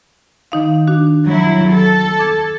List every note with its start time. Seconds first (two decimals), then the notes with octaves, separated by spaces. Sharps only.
0.52 D#3 D#4 F5
0.88 D4 F#4
1.27 F#3 E4
1.70 A4
2.19 D6 G#6